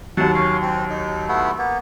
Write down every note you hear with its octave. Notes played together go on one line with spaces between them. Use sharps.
D#2 F#3 F#5 A5
C#4 F5
C4
D#4
A3 B3 E4
A#3 B3